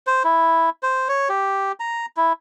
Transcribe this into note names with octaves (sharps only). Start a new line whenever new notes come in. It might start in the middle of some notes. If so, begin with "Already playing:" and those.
C5
E4
C5
C#5
G4
A#5
E4